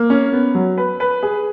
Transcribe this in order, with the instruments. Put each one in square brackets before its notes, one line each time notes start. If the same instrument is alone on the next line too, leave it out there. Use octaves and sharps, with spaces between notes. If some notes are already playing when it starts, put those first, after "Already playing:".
Already playing: [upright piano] A#3
C#4
B3
F#3
B4
B4
G#4